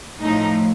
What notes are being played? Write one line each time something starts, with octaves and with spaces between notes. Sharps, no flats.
A2 F3 D#4